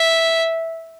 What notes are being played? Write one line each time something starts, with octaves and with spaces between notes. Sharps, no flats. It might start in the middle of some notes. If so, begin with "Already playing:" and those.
Already playing: E5